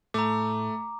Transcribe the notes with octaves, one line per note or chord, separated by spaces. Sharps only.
A2 A3 A#5 D6